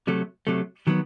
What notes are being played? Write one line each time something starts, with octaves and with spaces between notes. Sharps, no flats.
C3 F#3 A3
C3 F#3 A3
D#3 F#3 B3